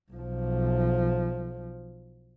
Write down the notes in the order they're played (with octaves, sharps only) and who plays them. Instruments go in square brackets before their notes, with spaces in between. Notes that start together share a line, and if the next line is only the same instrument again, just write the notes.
[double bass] B1 F3